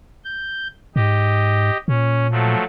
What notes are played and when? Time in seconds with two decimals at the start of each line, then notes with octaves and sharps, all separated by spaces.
0.25 G6
0.96 G#2 G4 D#5
1.88 A#2 C#4
2.31 F3 F#3 A3